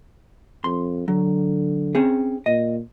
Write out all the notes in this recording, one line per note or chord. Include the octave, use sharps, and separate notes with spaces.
F2 C6
D3 F#3
C4 C#4 G#4
A#2 D#5